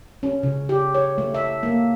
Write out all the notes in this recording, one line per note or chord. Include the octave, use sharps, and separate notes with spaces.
C#4
C#3
G4
C#5
A3
E5
A#3